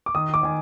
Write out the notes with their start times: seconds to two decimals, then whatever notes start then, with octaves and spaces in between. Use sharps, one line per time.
0.06 D6
0.15 D#3 D#6
0.34 D6
0.43 D#3 G#5